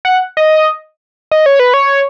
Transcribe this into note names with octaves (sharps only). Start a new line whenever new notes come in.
F#5
D#5
D#5
C#5
B4
C#5